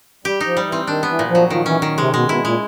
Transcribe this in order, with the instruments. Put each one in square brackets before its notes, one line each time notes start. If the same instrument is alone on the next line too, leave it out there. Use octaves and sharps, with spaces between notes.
[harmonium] G3 [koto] G4
[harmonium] F3 [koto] D#4
[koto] G3
[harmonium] E3
[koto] C4
[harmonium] D#3 [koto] D4
[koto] B3
[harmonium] E3
[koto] A#2
[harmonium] F3
[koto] F#3
[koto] D#3 [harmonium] F3
[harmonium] E3 [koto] C#4
[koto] D#3
[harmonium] C3 [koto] G#3
[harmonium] B2 [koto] G#3
[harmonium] C3
[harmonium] B2 [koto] E4
[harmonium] A#2 [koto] G#3